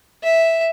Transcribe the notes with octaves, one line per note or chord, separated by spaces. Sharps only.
E5